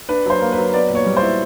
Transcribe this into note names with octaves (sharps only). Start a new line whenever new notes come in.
D4 B4
F#3 C5
A#3
B4
F#3
B3 D5
A#2
C#5
G3
C5
E4